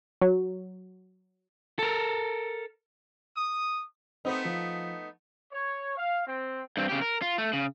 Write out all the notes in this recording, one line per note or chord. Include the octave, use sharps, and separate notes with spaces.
F#3
A4 A#4
D#6
A3 B3 C4 D#4 C5
F3
C#5
F5
C4
G2 C4
C#3 G4
A#4
F4
A3
C#3